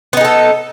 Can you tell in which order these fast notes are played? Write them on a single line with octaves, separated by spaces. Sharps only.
B3 D#4 G#4 A4